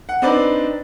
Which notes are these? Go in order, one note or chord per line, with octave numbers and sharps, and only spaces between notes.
F#5
C4 D4 D#4 B4 D5